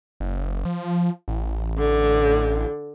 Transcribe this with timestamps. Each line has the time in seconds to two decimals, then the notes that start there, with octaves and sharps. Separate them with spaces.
0.20 F#1
0.65 F3
1.28 A1
1.78 D3